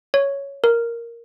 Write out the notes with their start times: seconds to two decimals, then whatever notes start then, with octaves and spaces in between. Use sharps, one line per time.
0.14 C#5
0.64 A#4